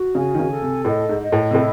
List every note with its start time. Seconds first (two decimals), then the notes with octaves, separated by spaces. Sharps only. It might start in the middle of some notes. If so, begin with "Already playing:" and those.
Already playing: F#4
0.15 C#3 G#5
0.35 D#3
0.39 C#3
0.51 A4
0.62 C3
0.85 A2 D#5
1.09 G#2
1.21 D#5
1.32 A2
1.51 C3
1.54 A2 E4